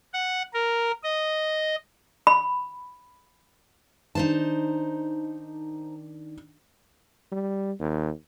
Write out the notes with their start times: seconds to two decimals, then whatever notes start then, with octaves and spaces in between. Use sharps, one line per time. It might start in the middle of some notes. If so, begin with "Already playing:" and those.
0.14 F#5
0.54 A#4
1.04 D#5
2.27 B5
4.15 D#3 D4 D#4 C5 A5
7.32 G3
7.80 D#2